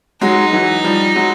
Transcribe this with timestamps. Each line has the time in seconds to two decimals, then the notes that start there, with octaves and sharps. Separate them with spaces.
0.21 F#3 G#3 D#4
0.53 E3 F#3
0.84 F3 G3
1.15 F#3 G#3